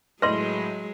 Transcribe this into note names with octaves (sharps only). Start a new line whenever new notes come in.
A2 F#3 G#3 B4 D#5 C6 A#6